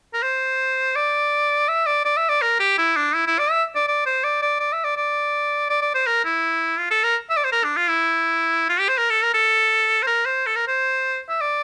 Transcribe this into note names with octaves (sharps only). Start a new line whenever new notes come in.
A#4
C5
D5
E5
D5
D5
E5
D5
A#4
G4
E4
D4
E4
E4
D5
E5
D5
D5
C5
D5
D5
D5
E5
D5
D5
D5
D5
C5
A#4
E4
F4
A4
A#4
E5
D5
C5
A#4
D4
F4
E4
F4
G4
C5
A#4
A4
A#4
A4
C5
A#4
C5
A4
A#4
C5
E5
D5